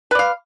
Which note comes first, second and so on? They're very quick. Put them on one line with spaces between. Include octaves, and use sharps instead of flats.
B4 D5 F5